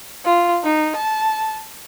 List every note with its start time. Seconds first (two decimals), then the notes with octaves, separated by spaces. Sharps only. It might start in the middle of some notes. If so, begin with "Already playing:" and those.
0.25 F4
0.64 D#4
0.96 A5